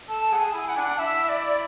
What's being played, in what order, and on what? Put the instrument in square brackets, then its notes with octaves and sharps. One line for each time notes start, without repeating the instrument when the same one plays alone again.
[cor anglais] A4 [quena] A5
[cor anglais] G#4 [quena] F#5
[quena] G#5
[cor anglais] E4
[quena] F#5
[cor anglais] D4 [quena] G#5
[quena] F#5
[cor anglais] D4
[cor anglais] E4 [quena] E5
[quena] D5